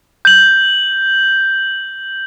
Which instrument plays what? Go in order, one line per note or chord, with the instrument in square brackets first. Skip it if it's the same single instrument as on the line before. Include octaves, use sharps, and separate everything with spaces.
[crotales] G6 F#7